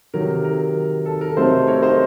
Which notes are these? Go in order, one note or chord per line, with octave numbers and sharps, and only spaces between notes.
C3 D#3 F#3 A#4
A#4
A4
A#4
C3 F#3 A3 C4 D#4 A4 C5
A#4 C#5
C5 D#5